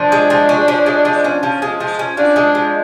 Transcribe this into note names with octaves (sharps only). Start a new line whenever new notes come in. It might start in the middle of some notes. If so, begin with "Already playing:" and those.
Already playing: F3 D4
G#3
F3
C#4
F3
G#3
F3
C#4
F3
G#3
F3
C#4
F3 D4
G#3
F3